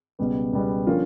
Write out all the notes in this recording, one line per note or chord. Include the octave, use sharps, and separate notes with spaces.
C#2 B2 G3 B3
C#2 B2 G3 B3
D3 F3 A#3 C#4 F4